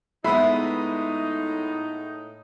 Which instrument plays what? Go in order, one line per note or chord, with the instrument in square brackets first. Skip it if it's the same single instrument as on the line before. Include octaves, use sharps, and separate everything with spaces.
[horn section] A2 D#4 [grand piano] G#3 B3 [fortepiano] E5 B5